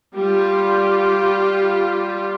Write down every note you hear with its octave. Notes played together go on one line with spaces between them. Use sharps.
G3 F4 G4